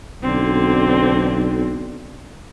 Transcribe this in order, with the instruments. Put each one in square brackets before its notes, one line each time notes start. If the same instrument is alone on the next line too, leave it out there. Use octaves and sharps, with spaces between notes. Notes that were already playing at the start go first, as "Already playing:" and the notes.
[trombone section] B1 [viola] D3 C4